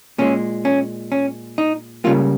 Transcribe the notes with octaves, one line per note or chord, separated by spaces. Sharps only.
A#2 G#3 C#4
C#4
C#4
D#4
C#2 C#3 G3 A#3 F4